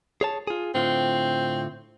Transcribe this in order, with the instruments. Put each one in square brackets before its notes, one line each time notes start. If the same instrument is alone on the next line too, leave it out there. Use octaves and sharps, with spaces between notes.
[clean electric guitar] G#4 C#5 A5
F4 G#4
[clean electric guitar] A2 D3 F4 [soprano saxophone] C4